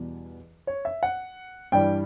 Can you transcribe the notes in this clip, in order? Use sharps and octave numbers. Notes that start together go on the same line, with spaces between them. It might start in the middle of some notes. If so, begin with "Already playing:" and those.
Already playing: E2 B2 G3
C#5
E5
F#5
G2 E3 G3 G5